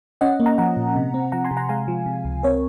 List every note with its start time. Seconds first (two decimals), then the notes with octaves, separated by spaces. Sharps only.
0.21 C#4 D#5 F#5
0.40 A#3
0.46 F#5 A#5
0.58 F3 F#5 A#5
0.77 A#2
0.96 C3
1.14 C4
1.32 F3 F#5 A#5
1.45 G#5 C6
1.51 C3
1.57 F#5 A#5
1.69 G#3 F5 G#5
1.88 F3
2.06 C3
2.25 C#2
2.43 C4 A#4 C#5